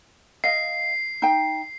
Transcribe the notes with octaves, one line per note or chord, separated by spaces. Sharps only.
D#5 F5 C7
D#4 G5